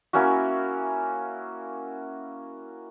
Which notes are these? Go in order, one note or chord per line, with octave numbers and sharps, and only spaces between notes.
A#3 C#4 E4 F#4